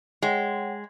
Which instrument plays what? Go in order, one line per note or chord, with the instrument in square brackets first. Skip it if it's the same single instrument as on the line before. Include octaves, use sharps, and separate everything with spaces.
[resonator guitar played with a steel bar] G#3 [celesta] C#5 F#5 G5